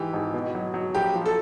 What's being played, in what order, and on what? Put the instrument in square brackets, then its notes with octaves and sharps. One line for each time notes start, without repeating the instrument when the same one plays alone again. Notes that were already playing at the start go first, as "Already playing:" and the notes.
Already playing: [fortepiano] G#2 E3 [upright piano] G4
[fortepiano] G#1
B2
F#3
F#3
[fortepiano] A#1 [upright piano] G4
[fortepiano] F3
[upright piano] A4